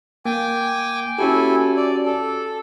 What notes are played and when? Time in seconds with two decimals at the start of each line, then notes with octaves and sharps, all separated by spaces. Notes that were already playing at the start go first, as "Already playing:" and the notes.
0.26 A#3 G5 G#5 D6
1.19 C#4 E4 F#4 G4 A4 G#5
1.77 D5
2.06 A4